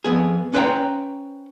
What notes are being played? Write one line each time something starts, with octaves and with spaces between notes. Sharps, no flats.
F2 B3 G#4
C#4 B4 C5 D#5 G5 A#5